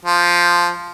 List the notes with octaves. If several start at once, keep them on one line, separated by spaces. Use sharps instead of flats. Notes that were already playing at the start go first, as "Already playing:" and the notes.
F3